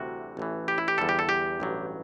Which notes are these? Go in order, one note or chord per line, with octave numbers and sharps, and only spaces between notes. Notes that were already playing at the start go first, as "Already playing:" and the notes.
Already playing: D2 C3 E3 G3 F#4
A1 A2 E3
G4
E4
G4
E2 D3 G3 A4
G4
A4
G4
A1 G2 F#3